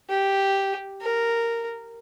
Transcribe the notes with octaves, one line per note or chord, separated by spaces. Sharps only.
G4
A#4